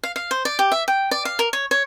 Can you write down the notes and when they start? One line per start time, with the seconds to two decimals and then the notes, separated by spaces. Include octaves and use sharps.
0.03 F5
0.16 F5
0.31 C5
0.45 D5
0.59 G4
0.72 E5
0.88 G5
1.11 D5
1.25 F5
1.39 A#4
1.53 C#5
1.71 C#5